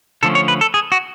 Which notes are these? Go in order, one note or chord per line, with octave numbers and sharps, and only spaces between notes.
D3 F3 A3 C#4 A4
C#5
B4
A4
G#4
F#4